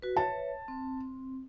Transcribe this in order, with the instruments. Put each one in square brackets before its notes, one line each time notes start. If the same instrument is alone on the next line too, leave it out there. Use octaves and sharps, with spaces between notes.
[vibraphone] F#4 B4
[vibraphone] B4 C#5 E5 [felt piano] A5
[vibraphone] C4